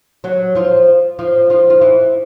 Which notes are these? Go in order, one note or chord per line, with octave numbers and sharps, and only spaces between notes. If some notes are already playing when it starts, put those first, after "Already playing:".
F#3 F#4
F3 F4
F3 F4
F3 F4
F4
E3 E4